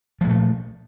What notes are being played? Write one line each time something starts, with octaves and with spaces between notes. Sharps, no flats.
A#2 F3 G#3 A3